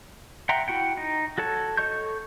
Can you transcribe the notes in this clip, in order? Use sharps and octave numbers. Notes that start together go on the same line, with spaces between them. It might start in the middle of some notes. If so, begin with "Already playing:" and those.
E5 F#5 G5 A#5 C6
E4 F#4 F#5 G5
D#4
F#4 A4 C#5 A5
A4 C#5 D#5 C#6 G6